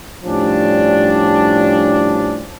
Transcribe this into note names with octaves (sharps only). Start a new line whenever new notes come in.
A2 F3 G3 C#4 D4